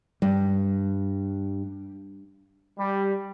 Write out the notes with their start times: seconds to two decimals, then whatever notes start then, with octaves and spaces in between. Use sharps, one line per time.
0.22 G2 G3
2.78 G3